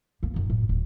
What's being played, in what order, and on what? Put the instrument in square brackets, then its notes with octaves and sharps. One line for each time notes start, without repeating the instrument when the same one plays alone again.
[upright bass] A#3 B3
F#2 D#4
A2
D#1